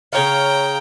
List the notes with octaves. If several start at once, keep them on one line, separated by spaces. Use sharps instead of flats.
C#3 C#5 F5 G5 A#5